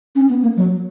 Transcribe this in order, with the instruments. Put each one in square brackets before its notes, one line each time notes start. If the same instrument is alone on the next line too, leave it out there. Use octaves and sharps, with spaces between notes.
[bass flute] C#4
B3
A#3
F#3